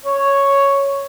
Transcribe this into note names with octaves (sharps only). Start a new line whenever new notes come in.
C#5